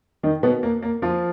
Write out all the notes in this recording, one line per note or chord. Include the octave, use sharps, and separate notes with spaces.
D#3 D#4
B2 B3
A#3
A#3
F3 F4